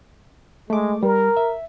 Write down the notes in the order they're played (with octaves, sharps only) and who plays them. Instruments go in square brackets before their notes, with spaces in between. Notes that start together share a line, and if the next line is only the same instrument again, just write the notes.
[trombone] G#3 [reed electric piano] A3 D6
[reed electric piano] G3 [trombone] A#4
[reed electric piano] E5